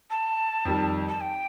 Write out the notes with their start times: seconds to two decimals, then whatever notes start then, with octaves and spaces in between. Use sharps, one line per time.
0.10 A5
0.65 F2 D#3 G3
1.09 A5
1.21 G5